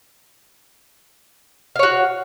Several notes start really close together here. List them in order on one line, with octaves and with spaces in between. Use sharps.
F5 C#5 F#4